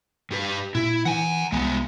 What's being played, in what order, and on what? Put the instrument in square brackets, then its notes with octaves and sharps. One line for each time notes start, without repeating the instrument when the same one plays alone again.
[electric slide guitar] G2 G4 B4
[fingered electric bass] A#2 [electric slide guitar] E4
[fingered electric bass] E3 [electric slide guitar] F#5 G#5
[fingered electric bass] C2 [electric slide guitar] G#3 B3